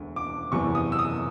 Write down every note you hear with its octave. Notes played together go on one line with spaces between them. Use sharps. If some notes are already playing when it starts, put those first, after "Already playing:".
Already playing: E1 D2 D3
D6
F#1 E2 C3 C#6
D#6
E6
D#6